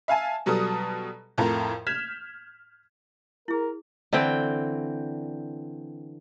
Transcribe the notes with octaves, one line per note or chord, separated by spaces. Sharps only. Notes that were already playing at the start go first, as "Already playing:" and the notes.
E5 F5 G#5 A5
B2 F#3 G3 A4 A5 D#6
F2 A2 F3 A4 A#4
F6 G6 G#6 B6 E7
E4 G#4 A#4
D3 E3 C4 G5